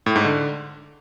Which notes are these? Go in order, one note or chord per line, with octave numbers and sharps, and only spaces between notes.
A2
G#2
D3